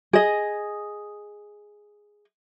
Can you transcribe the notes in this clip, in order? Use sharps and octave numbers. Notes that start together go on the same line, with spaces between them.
G#4 D#5